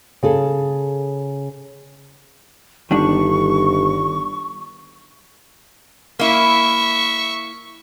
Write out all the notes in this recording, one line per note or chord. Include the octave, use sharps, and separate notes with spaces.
C#3 G#4 A4
G1 D#3 G3 D4 C#6
A#3 E4 E5 C#6